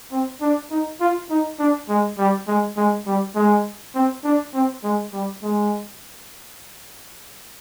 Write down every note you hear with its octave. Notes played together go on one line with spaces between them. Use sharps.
C4
D4
D#4
F4
D#4
D4
G#3
G3
G#3
G#3
G3
G#3
C4
D4
C4
G#3
G3
G#3